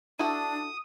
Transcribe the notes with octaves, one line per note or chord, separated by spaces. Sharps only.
D4 E4 F#4 A4 D#6